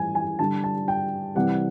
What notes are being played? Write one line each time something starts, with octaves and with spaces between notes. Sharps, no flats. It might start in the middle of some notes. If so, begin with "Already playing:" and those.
Already playing: A2 E3 G3 G#5
G#5
D3 G3 A5
A5
G5
C3 E3 G3 F#5